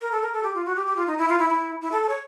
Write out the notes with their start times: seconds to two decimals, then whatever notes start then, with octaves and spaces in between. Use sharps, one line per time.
0.01 A#4
0.12 A4
0.22 A#4
0.33 A4
0.43 G4
0.55 F4
0.66 F#4
0.76 G4
0.86 G4
0.96 F4
1.07 D#4
1.18 E4
1.29 F4
1.39 E4
1.49 E4
1.81 E4
1.92 A4
2.03 A4
2.09 C#5